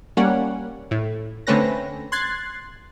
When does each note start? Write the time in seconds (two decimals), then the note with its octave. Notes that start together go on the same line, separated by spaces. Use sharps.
0.17 G3 A#3 C#4 F#5
0.91 A2
1.47 D3 A3 C4 C#4 B4 A#6
2.12 C6 F#6 G#6 A6 C7